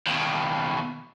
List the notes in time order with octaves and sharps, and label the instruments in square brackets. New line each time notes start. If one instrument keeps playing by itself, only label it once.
[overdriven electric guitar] D#2 B2